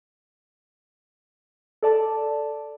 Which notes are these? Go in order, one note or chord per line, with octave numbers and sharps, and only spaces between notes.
A4 D5 A5